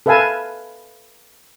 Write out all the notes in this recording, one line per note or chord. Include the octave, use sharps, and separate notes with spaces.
A4 B4 E5 F5 G#5 A5